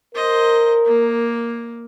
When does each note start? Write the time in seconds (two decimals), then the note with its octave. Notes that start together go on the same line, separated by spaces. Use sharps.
0.15 A#4 C5 D#5
0.86 A#3